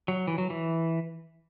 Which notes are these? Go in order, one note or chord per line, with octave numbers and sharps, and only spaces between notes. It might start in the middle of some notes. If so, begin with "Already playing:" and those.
F#3
E3
F#3
E3